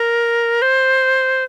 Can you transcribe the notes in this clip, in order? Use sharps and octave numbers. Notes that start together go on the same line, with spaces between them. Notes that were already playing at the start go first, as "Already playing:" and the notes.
Already playing: A#4
C5